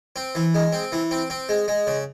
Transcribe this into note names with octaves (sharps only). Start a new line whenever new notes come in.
C4
E3
G#3
C4
E3
C4
C4
G#3
G#3
C#3